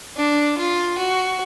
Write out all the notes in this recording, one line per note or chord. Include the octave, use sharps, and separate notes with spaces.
D4
F4
F#4